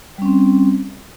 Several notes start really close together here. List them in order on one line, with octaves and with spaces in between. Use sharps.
G3 C#4 C4